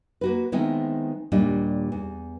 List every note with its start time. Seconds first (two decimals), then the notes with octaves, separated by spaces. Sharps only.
0.21 A#3 F#4 B4
0.52 D#3 E3 G#3 B3 C4 E4
1.32 D#2 A#2 G3 D4 D#5
1.92 E2